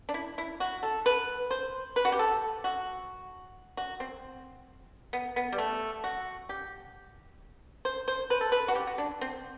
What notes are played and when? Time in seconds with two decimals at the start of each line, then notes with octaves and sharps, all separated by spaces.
0.09 D4
0.14 E4
0.38 E4
0.60 F#4
0.83 A4
1.06 B4
1.51 C5
1.96 B4
2.05 F#4
2.12 G4
2.19 A4
2.64 F#4
3.77 F#4
4.00 C4
5.13 B3
5.36 B3
5.52 G3
5.58 A3
6.04 F#4
6.49 G4
7.85 C5
8.08 C5
8.30 B4
8.41 A4
8.52 B4
8.68 F#4
8.75 G4
8.87 F#4
8.98 D4
9.21 C4